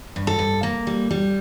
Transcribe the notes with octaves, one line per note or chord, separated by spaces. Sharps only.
G2
A4
G2
A#3
G3
G3